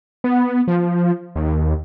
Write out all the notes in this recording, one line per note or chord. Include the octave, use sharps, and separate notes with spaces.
B3
F3
D#2